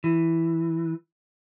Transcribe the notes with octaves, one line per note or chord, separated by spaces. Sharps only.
E3